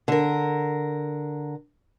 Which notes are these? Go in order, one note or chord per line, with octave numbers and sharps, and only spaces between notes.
D3 A#4